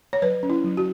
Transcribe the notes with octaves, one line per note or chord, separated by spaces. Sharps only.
C#5
F#3 B4
C#4
E4
F#3
F#4